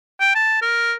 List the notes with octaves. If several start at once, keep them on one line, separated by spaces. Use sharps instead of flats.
G5
A5
A#4